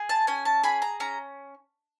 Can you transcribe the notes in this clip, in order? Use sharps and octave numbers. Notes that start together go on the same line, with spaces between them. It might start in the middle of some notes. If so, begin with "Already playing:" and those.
Already playing: G#4
A5
C#4 G#5
A5
G#4 B5
A#5
C#4 A#5